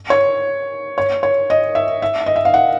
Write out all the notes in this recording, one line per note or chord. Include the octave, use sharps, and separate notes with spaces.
C#5
C#5
C#5
D#5
E5
E5
D#5
E5
F5
F#5